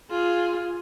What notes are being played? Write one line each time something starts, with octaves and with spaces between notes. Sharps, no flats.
F4 G#4